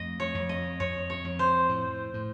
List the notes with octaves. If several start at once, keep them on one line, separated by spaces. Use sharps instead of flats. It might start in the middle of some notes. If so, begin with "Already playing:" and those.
Already playing: F2 A3 D#5
C#5
F2
D#5
F2 C#5
C#5
F2
C5
A2
A2